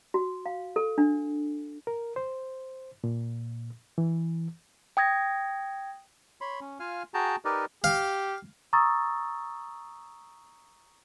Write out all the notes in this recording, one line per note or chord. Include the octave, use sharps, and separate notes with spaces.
F#4
F5
A4
D4
A#4
C5
A#2
E3
G5 D#6 G#6 A#6
C#5 B5 C6
C#4
F4 F5 G#5 F6
F#4 G#4 G5 A5 A#5
D#4 G4 A#4 B4 D5 D#5
G4 F5
A#5 C#6 D#6 E6 A6